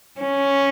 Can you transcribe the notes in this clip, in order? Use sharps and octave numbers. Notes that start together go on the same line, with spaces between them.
C#4